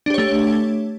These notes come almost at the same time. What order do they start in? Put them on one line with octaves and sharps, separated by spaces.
D4 G4 C#5 A3